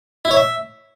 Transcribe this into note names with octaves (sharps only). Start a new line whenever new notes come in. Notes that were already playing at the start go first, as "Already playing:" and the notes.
E4
C#5
E5